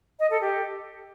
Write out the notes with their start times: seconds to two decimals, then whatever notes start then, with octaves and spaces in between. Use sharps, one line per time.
0.19 D#5
0.30 A4
0.41 G4